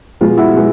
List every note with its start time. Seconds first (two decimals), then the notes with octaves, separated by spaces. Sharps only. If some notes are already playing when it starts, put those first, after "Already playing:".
0.21 B2 G#3 B3 F4
0.38 E4 F#4
0.54 B2 G#3 B3